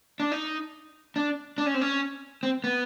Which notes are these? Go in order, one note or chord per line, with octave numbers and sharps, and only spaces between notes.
D4
D#4
D4
D4
C#4
C4
C#4
C4
B3